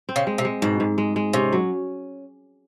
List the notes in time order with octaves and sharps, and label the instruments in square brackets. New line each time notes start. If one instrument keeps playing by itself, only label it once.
[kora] C4
[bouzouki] C#3
[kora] G#3
[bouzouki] C3
[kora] G#3
[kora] G#2 [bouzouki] B2
[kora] G#2
G#3
G#3
[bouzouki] C3 [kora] C#4
[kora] F#3